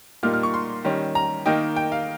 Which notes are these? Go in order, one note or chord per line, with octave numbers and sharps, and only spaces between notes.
A#2 G3 A#3 D#4 F6
F6
C#6
C6
D#3 G3 C#4
A#5
D#3 A#3 D#4 G5
G5
F5